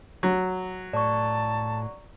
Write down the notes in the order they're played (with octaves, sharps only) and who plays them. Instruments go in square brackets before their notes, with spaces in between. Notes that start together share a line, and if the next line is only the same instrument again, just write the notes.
[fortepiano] F#3
[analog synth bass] A2 [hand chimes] D5 C#6 [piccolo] A5